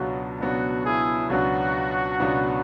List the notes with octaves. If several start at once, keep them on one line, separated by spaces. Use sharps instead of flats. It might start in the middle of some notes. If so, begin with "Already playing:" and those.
Already playing: C#2 B2 F#3 B3 D4 F#4
C#2 B2 F#3 B3 D4 F#4
E4 G#4
C#2 B2 F#3 B3 D4 F#4
C#2 B2 F#3 B3 D4